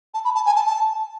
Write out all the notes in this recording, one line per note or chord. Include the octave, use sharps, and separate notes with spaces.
A5
B5
A5
G#5
A5
A5